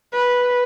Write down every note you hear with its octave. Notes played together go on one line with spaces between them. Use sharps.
B4